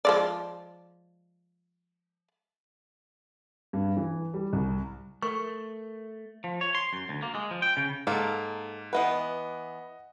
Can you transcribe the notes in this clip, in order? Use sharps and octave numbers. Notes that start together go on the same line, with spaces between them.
F3 G#3 D5
G2
E3
G3
C2
A3 A#4 C#6
F3
C#5
C6
F#2
D2
A#3
G#3
F3
G5
C#3
G#2 A#3 A4
E3 B3 B4 D#5 F#5